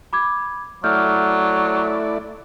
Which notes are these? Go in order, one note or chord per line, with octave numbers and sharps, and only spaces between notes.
B5 D6 G#6
F#3 A3 E4 D5 F6 G6